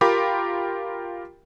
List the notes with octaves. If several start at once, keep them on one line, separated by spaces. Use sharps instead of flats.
F4 G4 A#4 G5 B5 D6